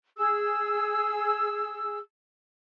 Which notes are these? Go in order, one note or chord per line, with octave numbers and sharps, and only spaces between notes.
G#4 E6